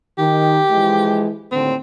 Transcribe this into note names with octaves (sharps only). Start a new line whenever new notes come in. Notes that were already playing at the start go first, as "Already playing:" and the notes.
D#3 G4
E3 F3 G#3
D#2 A2 D3 C4